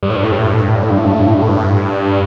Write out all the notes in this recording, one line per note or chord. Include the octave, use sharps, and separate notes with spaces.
G2
A2
G2
A2
G2
A2
G2
A2
G2
A2
G2
A2
G2
A2
G2
A2
G2
A2
G2
A2
G2
A2
G2